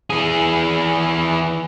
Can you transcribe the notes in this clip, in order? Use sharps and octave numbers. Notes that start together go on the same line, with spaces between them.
E3 G#4